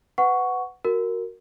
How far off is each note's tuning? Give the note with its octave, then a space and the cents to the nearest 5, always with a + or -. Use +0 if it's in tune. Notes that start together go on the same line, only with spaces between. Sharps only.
B4 +20 F#5 +0 C#6 +10
F#4 +0 A#4 -10